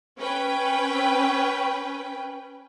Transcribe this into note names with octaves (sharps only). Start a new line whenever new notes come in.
C#4 B4 G5